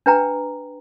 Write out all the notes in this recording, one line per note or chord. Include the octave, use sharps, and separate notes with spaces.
D4 B4 G5 A#5